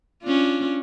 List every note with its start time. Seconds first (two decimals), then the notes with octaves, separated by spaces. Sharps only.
0.22 C#4 D4 F4